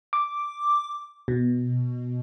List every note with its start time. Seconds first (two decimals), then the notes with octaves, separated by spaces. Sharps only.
0.13 D6
1.28 B2